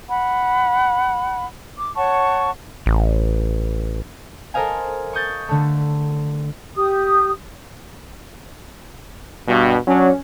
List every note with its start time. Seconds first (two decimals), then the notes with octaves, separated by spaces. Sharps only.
0.09 F#5 B5
1.78 D6
1.97 C#5 F#5 A5 C#6
2.86 A1
4.54 A4 A#4 C5 D#5 F5 G#5
5.13 C#6 D#6 G6 A6
5.48 D3 A3
6.75 G4 D#6
9.47 G2 B2
9.88 F#3 C#4 D4